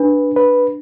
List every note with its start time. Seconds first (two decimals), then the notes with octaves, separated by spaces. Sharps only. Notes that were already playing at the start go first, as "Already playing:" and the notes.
Already playing: D4 B4
0.36 B4